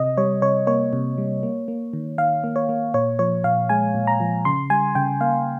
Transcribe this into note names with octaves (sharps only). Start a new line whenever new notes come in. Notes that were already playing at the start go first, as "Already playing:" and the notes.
Already playing: C3 D#5
G3 C#5
C3 C#5
A#3 C#5
C3
G3
A#3
A#3
D#3
D#3 F5
A#3
C#5
A#3
A#2 C#5
F3 C#5
A#2 F5
G#3 G#5
A#2
A#5
F3
C#3 C6
G3 G#5
C#3 G5
A#3 F5